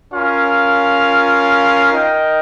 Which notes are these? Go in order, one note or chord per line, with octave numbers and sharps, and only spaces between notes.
C#4 F4 A#4 F5
D#4 A#4 D#5 G5